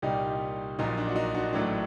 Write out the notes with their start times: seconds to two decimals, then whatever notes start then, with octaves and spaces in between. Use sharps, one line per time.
0.02 C2 A#2 G3 D#4 G4
0.79 A#1 A#2 F#3 D#4
0.97 D4
1.09 F#4
1.16 D#4
1.35 D4 F#4
1.53 A1 A2 F#3 A3 D4